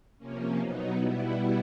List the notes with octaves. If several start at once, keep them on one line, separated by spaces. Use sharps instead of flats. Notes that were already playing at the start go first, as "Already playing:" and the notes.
C3 F3 A#3 C#4
B2 F#3 B3 D#4
B2 G3 B3 E4